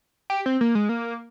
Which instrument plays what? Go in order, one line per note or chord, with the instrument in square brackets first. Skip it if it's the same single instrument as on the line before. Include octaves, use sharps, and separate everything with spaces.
[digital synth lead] G4
C4
A#3
G#3
A#3